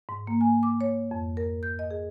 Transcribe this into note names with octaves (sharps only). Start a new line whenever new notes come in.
G#2
A#3
G#5
D6
C#5
F2
A#4
G6
D#5
G#4